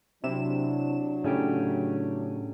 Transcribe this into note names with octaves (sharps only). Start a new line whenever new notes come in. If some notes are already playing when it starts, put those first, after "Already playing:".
C3 F#3 D4 E4 E7
A2 C#3 A3 C#4 G4